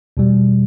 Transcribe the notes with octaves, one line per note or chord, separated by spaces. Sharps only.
E2 B2 G3